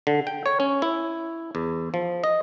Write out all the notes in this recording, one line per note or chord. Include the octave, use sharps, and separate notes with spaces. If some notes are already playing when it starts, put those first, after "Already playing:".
D3
G5
C#5
C#4
E4
E2
F3
D#5